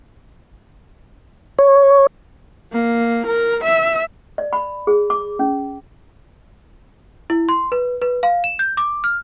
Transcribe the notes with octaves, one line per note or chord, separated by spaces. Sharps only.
C#5
A#3
A#4
E5
D5
B5
G#4
D6
C#4
E4
C6
B4
B4
F5
E7
G6
D6
F6